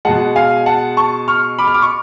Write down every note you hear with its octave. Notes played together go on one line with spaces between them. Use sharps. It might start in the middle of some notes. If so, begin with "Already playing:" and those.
B2 G#3 F#5 A5
F5 G#5
F#5 A5
A5 C#6
C#6 F6
B5 D6
F6
D6
C#6